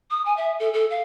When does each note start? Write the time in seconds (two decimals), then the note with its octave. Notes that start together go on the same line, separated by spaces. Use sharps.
0.11 D#6
0.26 G#5
0.37 E5
0.60 A4
0.73 A4
0.90 F5